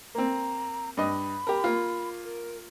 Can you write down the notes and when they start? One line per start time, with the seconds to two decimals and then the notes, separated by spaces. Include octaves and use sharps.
0.15 A#3 C4 A#5
0.97 G2 D#5 B5
1.47 G4 A#4
1.64 A#3 F4
2.24 A#4